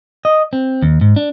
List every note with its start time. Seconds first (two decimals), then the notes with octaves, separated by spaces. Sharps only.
0.25 D#5
0.53 C4
0.82 D#2
1.01 G#2
1.16 D4